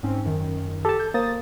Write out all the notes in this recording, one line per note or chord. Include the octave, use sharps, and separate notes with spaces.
G#2 C4 C#4
F#2 D#3
G4 A4 A5
G6
A#3 C5 D#6 A6